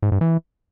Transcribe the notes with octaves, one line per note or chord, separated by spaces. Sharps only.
G#2
G2
E3